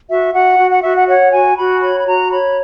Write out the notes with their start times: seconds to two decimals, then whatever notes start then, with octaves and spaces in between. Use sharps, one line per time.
0.09 F#4 E5
0.34 F#4 F#5
0.59 F#4
0.71 F#5
0.82 F#4 E5
0.96 F#5
1.08 C#5 F#5
1.32 F#4 G#5
1.56 F#4 B5
1.82 C#5 B5
1.99 B5
2.06 F#4 A#5
2.31 C#5 B5